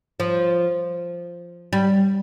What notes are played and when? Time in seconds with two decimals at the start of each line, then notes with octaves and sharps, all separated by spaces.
0.20 F3
1.73 G3